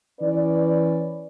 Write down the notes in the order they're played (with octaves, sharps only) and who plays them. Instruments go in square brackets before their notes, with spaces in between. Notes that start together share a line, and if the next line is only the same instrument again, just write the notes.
[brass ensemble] E3 C#4 B4 D5